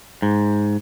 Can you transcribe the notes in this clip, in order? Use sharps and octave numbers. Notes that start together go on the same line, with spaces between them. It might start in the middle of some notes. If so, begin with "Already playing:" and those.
G#2